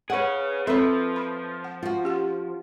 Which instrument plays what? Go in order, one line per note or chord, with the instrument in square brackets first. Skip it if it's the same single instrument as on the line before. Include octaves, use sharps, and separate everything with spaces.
[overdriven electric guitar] G#4 C#5 [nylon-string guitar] B4 F#5
[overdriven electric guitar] F3 [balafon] C4 A4 C6 [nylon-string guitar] B4 E5
[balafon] B5
F#5
[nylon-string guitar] F4 F#4
[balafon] C#4 G4 F#5